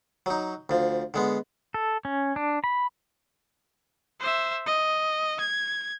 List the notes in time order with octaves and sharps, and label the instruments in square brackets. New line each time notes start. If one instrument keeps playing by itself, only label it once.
[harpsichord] F#3 D#4
D2 F3
D3 G#3 B3
[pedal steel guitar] A4
C#4
D4
B5
[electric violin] C5 E5
D#5
G#6